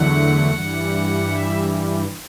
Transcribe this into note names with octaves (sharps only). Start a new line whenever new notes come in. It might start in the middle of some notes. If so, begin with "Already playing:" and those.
Already playing: E2 D3 F#3 A3 F#5
G2 E3 G3
E5